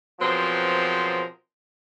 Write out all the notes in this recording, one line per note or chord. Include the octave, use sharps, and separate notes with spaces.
B2 F3 F#3 C4 G#4 A#4